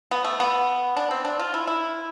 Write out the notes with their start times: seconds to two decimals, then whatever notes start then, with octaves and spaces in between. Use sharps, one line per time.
0.11 B3
0.24 A3
0.40 B3
0.97 D4
1.11 C4
1.25 D4
1.39 F4
1.54 E4
1.67 E4